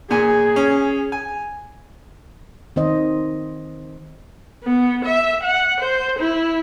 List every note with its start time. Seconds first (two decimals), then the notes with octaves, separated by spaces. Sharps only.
0.11 A#2 G#4 G#5
0.56 C#4
1.12 G#5
2.76 D#3 C4 C5 D#5
4.64 B3
5.05 E5
5.43 F#5
5.81 C5
6.19 E4